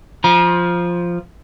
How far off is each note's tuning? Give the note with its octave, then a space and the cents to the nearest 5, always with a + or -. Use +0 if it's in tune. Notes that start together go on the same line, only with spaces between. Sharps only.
F3 +0 A#5 +40